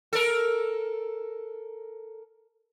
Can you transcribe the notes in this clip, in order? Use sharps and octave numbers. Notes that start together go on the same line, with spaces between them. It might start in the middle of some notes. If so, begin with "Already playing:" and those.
A4 A#4